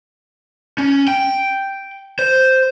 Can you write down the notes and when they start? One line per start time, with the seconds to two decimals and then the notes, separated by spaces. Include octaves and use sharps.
0.78 C#4
1.08 G5
2.19 C5